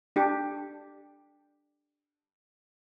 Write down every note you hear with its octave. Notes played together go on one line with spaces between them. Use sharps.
D4 G4